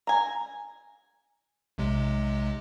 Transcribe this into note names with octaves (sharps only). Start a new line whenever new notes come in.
G#5 A#5
B1 C3 G#3